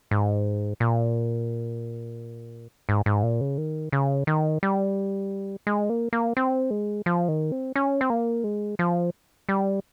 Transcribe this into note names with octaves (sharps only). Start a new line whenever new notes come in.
G#2
A#2
G#2
G#2
A#2
C#3
D#3
C#3
D#3
G3
G#3
A#3
A#3
C4
G#3
F3
D#3
C4
C#4
C4
A#3
G#3
F3
G3